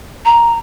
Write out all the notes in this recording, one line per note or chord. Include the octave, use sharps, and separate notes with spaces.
A#5